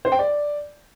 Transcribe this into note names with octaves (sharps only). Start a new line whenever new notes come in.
C5
G5
D5